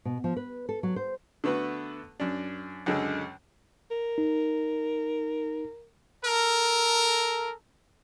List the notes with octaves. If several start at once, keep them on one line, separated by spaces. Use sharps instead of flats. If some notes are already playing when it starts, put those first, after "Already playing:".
B2
F3
B4
A4
F#3
C5
D3 A3 B3 F#4 B4
F#2 D4
C#2 F#2 D3 G#3
A#4
D#4
A4 A#4